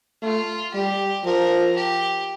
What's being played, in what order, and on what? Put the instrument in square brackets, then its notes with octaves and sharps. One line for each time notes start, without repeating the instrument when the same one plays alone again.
[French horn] A3 [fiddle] F4
[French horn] G3 [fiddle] G4
[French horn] F3 [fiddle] A#4
[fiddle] G4